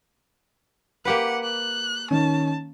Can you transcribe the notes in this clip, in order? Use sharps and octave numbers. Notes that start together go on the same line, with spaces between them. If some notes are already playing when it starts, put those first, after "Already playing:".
A#3 G4 B4 F#5
F#6
D#3 C#4 A5